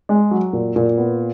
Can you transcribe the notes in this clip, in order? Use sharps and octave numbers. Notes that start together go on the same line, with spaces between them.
G#3
F#3
A#2
A#2
B3